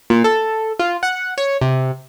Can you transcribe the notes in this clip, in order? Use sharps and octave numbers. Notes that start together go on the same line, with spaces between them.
A#2
A4
F4
F#5
C#5
C3